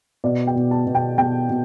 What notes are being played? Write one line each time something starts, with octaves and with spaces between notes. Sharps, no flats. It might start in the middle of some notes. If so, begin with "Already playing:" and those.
B2 D5
G5
B2
A5
B2
G5
B2 G5
B2